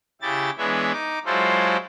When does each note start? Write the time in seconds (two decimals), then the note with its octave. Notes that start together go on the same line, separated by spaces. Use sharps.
0.22 C#3 E4 G4 A6
0.58 E3 G#3 B3 D4 C#5 E5
0.92 D#4 D6
1.25 F#3 G#3 E4 F4 A4 C5